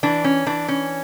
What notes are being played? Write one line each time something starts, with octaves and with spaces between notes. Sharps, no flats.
E3 D4
C#4
E3 D4
C#4